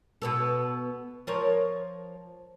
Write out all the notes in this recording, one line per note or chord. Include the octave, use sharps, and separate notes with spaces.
B2 B3 A4
F3 A#4 C#5